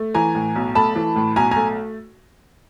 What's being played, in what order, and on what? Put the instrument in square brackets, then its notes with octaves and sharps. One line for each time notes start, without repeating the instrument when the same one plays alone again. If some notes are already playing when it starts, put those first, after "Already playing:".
Already playing: [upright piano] A3
E3 G#5 A#5
A2
B1
A3 A5 B5
E3
A2
B1 G#5 A#5
A3 G#5 A#5